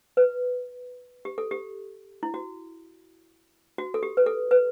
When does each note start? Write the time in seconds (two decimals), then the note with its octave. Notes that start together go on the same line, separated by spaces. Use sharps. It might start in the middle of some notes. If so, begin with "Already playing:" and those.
0.17 B4
1.25 G4
1.38 A4
1.51 G4
2.23 E4
2.34 F#4
3.78 F#4
3.94 A4
4.03 G4
4.17 B4
4.26 A4
4.51 B4